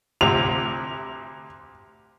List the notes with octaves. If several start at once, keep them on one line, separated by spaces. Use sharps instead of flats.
D2 C3 F7